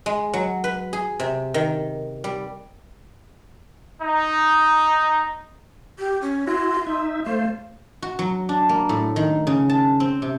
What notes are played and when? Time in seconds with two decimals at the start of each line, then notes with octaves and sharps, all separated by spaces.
0.06 G#3
0.33 F#3
0.64 B4
0.93 G#4
1.19 C3
1.54 D#3
2.24 G3
4.02 D#4
5.99 G4
6.22 C#4
6.47 E4 F#4 C6
6.87 D#4 E5
7.26 A3 C5 F5
8.02 F#4
8.19 F#3
8.49 D4
8.69 A#3
8.89 A2
9.16 D#3
9.47 C#3
9.69 A5
10.00 C4
10.22 C3